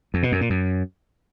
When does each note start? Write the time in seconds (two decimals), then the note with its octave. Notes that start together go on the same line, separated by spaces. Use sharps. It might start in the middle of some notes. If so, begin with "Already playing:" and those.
0.14 F2
0.23 B2
0.32 F#2
0.41 A#2
0.50 F#2